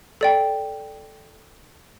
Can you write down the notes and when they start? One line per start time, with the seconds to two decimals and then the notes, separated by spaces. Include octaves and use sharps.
0.21 A4 D5 G5